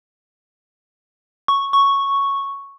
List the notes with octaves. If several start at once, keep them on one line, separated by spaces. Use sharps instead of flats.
C#6
C#6